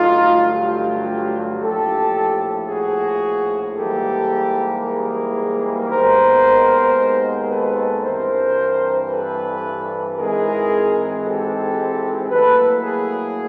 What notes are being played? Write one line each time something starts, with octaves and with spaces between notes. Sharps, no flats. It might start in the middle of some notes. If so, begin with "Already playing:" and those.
Already playing: G2 D3 F#3 A3 D#4 F4
F4 G4
A#1 A2 F3 G4 A4
F#4 G#4
G#2 E3 G3 A#3 G4 A4
G#4 A#4
D#2 D#3 G#3 B3 A#4 C5
A4 B4
G2 E3 G3 C4 A#4 C5
A4 B4
G#1 G#2 E3 G#3 C4 G#4 A#4
G4 A4
A2 F#3 A#3 A4 B4
G#4 A#4